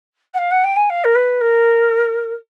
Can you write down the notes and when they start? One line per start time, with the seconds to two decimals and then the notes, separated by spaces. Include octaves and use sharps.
0.34 F#5
0.38 F5
0.51 F#5
0.64 G5
0.76 G#5
0.89 F5
1.04 A#4
1.15 B4
1.41 A#4